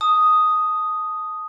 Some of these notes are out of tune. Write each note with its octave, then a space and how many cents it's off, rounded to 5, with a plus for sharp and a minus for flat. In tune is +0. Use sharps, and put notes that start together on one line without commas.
A5 +0 D#6 +0